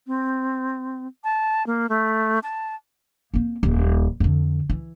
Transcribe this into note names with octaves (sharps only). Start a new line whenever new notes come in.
C4
A5
A#3
A3
A5
A#3 C4
D#1 F3
F2 D3
E3